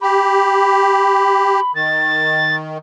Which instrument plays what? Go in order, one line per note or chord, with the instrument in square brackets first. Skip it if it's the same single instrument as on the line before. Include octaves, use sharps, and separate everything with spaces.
[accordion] G4 [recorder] B5
[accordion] D#3 [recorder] A6